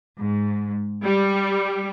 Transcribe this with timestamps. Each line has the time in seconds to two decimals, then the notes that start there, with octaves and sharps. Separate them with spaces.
0.18 G#2
1.04 G3